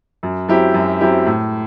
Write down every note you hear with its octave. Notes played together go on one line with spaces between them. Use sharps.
F#2
F#3 C4 E4 G4
F#2
F#3 C4 E4 G4
A2